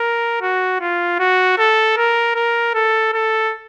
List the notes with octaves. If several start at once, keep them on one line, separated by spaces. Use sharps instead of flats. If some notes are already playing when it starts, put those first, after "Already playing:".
Already playing: A#4
F#4
F4
F#4
A4
A#4
A#4
A4
A4